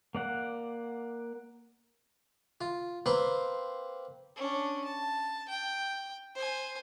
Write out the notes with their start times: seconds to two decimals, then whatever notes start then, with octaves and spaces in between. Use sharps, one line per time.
0.15 A#3 D5 F#5
2.61 F4
3.06 A#3 C4 B4 C6
4.36 C#4 D4
4.84 A5
5.49 G5
6.35 C5 G#5